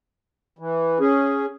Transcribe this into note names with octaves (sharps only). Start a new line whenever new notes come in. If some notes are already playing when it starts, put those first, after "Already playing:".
E3
C#4 G#4